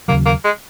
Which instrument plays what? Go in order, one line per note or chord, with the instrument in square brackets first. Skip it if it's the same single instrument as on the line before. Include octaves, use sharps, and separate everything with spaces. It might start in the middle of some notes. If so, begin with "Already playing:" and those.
[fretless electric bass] D#2 C#3 F#3 [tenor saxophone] A#3
[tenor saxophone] A#3
G#3